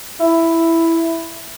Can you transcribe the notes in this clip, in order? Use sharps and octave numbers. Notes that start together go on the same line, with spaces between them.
E4